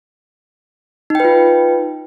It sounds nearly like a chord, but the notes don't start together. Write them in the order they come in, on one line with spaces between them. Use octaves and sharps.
D#4 G5 B4 F4